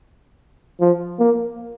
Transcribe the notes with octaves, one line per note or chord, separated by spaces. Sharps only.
F3
A#3